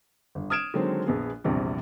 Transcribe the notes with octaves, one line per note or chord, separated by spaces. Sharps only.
G1
D#6 F6 G#6 D7 E7
D3 D#3 F#3 G#3 C4
A#1 B3 G#4
A#1 E2 C3 G3